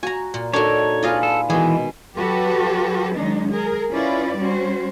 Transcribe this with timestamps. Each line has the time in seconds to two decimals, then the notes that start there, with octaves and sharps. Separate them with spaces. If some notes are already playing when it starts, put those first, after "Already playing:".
0.03 F#4 G#5 A#5
0.34 A#2
0.53 D4 D#4 F#4 A4 A#4 C#5
1.03 F4 G#4 B4 D5 D#5 F5
1.23 A4
1.50 B2 D#3 E3 G#3 G#4
2.16 F#3 F#4 G4 A4 B4
3.15 D#3 F#3 G#3 D4 D#4
3.52 G#4 A#4
3.92 C#4 E4 F4 B4 D5
4.37 G3 C#4 F#4 C5